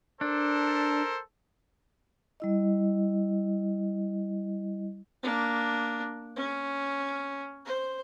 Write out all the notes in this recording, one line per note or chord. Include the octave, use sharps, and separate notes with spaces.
D4 A4 A#4 C5
G3 E4 D#5
A#3 D4
C#4
C5